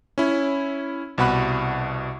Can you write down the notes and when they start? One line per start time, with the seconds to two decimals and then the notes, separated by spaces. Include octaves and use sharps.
0.18 C#4 E4
1.18 C2 B2 F#5 B5 F#6